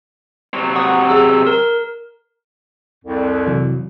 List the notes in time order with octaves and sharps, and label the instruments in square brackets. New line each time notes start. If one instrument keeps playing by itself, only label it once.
[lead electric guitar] C3 F#3
[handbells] F#5 C#6 D#6
G#4 E6
A#4
[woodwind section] C2 F2
[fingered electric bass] C3 E3 F#3